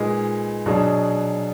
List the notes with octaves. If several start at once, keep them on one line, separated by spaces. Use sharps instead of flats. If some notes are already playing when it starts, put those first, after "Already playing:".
Already playing: A#2 G#3 D#4 G#4 B4
B2 F#3 D4 G#4